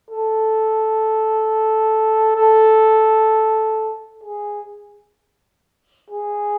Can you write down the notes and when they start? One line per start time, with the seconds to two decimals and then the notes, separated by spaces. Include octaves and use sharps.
0.10 A4
2.35 A4
4.23 G#4
6.10 G#4